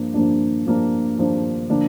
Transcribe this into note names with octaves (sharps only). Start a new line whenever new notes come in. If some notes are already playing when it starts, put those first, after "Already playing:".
Already playing: G2 F3 A#3 D4
G2 F3 A#3 D4
G2 F3 A#3 D4
G2 F3 A#3 D4
D3 F3 A#3 D4